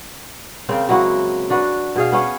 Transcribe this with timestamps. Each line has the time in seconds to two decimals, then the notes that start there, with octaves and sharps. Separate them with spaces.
0.69 C#3 A#3 C4 G5
0.89 F#3 G#3 E4 F#4
1.50 D4 F#4 B4
1.96 B2 G#4 F5
2.12 B3 C#4 C#5